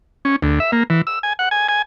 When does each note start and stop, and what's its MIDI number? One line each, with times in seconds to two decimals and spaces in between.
0.25 0.36 61
0.42 0.59 38
0.60 0.71 76
0.72 0.83 58
0.90 1.02 52
1.07 1.19 88
1.23 1.33 80
1.39 1.49 78
1.51 1.68 80
1.69 1.82 80